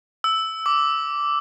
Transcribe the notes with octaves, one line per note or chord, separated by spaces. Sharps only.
E6
D6